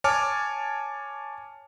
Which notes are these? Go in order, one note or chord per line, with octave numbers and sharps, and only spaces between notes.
C#5 G#5 A5 D6 F6